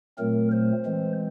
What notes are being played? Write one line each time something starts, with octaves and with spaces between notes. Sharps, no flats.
A#2 F#3 A3 C4 A#4
C5
E3 G#3 C4